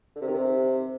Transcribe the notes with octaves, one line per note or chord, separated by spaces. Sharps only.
D3
C3
D#3
C3